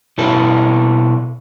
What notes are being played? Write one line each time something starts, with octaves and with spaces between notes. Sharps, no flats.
B2 E4 A4 B4